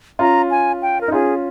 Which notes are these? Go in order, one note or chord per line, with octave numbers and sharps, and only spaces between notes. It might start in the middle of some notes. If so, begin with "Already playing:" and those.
C#4 F4 A#5
G#5
G5
A#4
D#4
C#4 F4 G#4